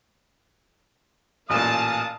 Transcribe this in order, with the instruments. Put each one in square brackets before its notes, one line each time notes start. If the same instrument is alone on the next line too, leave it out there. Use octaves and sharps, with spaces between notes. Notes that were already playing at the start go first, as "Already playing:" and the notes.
[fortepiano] A1 A#2 [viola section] F5 A5 [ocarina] G#5 [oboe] D#6